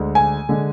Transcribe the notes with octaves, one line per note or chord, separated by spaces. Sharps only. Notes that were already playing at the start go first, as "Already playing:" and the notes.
Already playing: D2 D3 G#3
G#5
D3 G#3